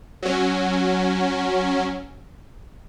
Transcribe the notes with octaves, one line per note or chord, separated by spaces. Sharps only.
F#3 C#4